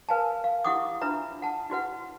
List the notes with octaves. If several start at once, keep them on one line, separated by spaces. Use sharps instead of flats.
A#4 B4 F5 G#5 A5
F5
E4 G4 F#5 D6 D#6
D4 F4 B4 E5 A#5
F#5 A5
E4 F#4 B4 F#5